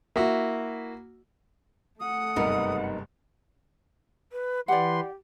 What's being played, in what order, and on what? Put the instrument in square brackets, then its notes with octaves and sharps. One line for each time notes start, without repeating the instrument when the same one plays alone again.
[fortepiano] A#3 F#4 [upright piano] E4 E5
[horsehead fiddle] A3 F#5 [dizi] D#6
[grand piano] F#1 G2 C3 [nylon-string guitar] B3 D#4 A#4
[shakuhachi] B4
[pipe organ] E3 B4 C6 [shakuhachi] G4 [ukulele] D5 F#5